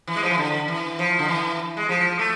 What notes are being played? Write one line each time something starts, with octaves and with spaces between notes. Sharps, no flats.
E3
G#3
F3
E3
D3
E3
F3
D3
E3
G#3
F3
A3